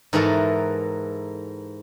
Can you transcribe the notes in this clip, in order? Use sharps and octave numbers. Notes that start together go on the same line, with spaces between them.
G#2 E3 F#4 A4 A#4 A5